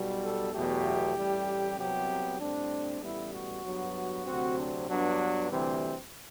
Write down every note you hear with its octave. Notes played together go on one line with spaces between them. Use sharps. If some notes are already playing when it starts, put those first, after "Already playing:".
Already playing: B1 B2 G3
A4
E2 B2 F#3 A3 G4
A1 A2 G3
C2 C3 F#3 B3 G4
A2 G3 C4 D4
A1 A2 G3 B3 E4
F#4
G2 F#3 B3
D2 C3 F#3 C4 F#4
D4
G2 F#3 B3 D4
D2 C3 E3 G3 C4